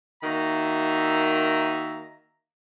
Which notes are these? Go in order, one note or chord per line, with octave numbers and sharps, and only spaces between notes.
D#3 A#3 F#4 E5 A#5